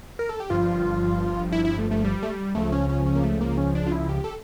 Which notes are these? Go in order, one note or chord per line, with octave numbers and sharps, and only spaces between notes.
A#4
A4
G4
G1 G2 F3 F4
E4
E4
A3
A3
G3
A3
G3
C#2 C#3 F3 A3
C#4
C#4
C#4
A#3
A3
A#3
C#4
D4
F4
E4
G4
A4